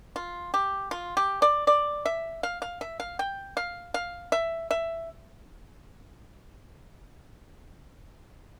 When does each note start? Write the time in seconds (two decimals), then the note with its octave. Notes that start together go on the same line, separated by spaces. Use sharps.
0.16 F4
0.54 G4
0.91 F4
1.17 G4
1.42 D5
1.67 D5
2.05 E5
2.43 F5
2.62 F5
2.81 E5
3.00 F5
3.19 G5
3.57 F5
3.94 F5
4.32 E5
4.71 E5